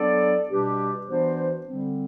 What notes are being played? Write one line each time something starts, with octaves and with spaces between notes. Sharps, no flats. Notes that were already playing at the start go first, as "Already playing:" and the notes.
Already playing: F#3 B3 D4 A4 D5
B2 G3 D4 G4 B4
E3 B3 D4 F#4 C5
D3 G3 C4